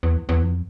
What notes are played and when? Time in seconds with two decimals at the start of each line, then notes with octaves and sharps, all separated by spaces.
0.03 E2
0.29 E2
0.42 F2